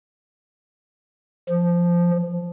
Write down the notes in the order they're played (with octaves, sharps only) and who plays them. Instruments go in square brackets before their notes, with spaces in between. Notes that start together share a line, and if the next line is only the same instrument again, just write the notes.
[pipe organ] F3